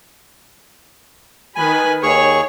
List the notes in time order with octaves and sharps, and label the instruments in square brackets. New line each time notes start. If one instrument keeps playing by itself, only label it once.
[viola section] D#3 B4 B5 [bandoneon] G#5
[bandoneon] D#2 G#4 C#6 [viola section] C#5